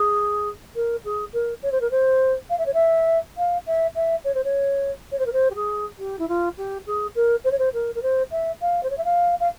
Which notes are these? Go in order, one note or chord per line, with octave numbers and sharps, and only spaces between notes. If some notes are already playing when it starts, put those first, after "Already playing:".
Already playing: G#4
A#4
G#4
A#4
C#5
C5
A#4
C5
F5
E5
C#5
E5
F5
E5
E5
C#5
C5
C#5
C#5
C5
A#4
C5
G4
G#4
G4
E4
F4
G4
G#4
A#4
C5
C#5
C5
A#4
A#4
C5
E5
F5
C5
C#5
E5
F5
F5